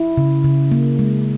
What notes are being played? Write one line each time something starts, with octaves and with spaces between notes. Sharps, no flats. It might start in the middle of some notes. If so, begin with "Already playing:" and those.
Already playing: E4
C#3
C#3
A#3
G#3